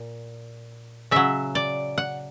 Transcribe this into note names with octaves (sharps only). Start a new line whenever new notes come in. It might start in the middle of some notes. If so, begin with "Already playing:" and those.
Already playing: A#2
C#3 F#3 E5
D5
F#5